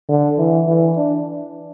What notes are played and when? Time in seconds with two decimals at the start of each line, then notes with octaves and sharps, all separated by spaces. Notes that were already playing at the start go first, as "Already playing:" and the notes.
0.09 D3
0.38 E3
0.67 E3
0.96 D4